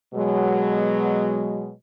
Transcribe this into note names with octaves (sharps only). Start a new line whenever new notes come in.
B2 F#3 G#3